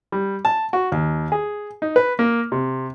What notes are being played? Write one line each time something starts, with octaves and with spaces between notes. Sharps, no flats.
G3
A5
F#4
D#2
G#4
D#4
B4
A#3
C3